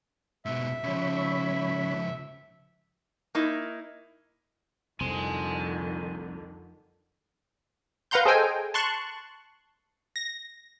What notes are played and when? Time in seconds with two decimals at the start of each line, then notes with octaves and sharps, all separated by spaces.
0.45 G#2 B2 E5
0.84 C#2 C#3 F3 C#5 B5
3.35 A#3 D#4 E4
5.01 F1 C2 F2 D3 D#3 C4 G#5 C6
8.11 B4 F5 F#5 A#5 C6 G6
8.25 G#4 A4 C5 D#5 G5 G#5
8.74 A5 C6 C#6 F#6
10.16 A#6